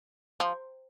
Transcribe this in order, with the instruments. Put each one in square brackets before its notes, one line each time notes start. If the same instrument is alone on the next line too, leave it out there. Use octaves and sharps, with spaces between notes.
[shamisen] F3